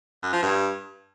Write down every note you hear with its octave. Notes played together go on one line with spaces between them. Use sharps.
F#2
F3
G2